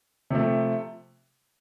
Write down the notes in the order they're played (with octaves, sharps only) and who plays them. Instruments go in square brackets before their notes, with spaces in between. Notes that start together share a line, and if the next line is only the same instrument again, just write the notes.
[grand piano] C3 F3 A3